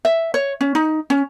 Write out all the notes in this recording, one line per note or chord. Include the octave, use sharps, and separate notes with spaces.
E5
C#5
C#4
D#4
C#4